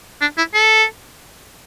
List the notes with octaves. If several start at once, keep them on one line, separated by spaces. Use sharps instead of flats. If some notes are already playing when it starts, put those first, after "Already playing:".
D4
E4
A4